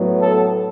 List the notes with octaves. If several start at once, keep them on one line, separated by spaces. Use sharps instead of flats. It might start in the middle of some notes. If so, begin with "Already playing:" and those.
Already playing: A2 F#3 B3
A4